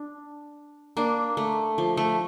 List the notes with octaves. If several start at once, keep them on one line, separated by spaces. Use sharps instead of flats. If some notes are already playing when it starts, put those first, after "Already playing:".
Already playing: D4
A#3 D4
A3
F3
A3